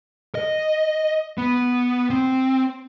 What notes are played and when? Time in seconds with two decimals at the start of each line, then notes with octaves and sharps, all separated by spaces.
0.35 D#5
1.38 B3
2.10 C4